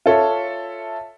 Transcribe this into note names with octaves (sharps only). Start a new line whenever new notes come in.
F4 A4 C#5 E5